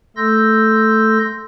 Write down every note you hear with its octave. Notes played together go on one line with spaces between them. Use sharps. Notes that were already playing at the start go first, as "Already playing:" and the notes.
A3 A4 C6 E6 G6 A#6